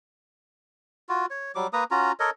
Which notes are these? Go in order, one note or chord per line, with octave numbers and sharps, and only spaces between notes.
F4 F#4
C#5
F#3 G3 D6
A#3 B4 A#5 D#6
C#4 F4 F#4 A#5
A4 A#4 C#5 D#5